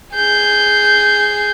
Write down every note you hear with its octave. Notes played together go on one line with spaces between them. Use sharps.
G#4 G6